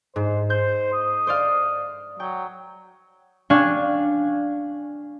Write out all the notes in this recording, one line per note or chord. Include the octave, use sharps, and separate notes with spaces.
G#2 C5
C5 G6
D#5
C5 D5 F5
F#3 G5
D4 F5 G5 G#5 C#6